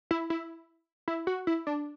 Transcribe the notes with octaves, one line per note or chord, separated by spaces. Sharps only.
E4
E4
E4
F#4
E4
D4